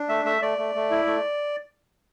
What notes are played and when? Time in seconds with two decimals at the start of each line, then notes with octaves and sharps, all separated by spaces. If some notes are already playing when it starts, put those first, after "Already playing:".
Already playing: D4
0.09 A3 E5
0.25 A3 E5
0.42 A3 D5
0.58 A3
0.75 A3
0.91 E4
1.07 A3